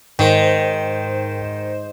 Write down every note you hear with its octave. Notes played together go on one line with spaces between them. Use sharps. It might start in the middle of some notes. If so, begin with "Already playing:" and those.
G#2 D#3 A#4 C5 D#5 G5 E7